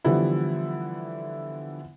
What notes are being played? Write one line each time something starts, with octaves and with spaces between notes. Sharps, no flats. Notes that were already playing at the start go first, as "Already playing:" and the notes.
D3 E3 F3 G3 B3 E4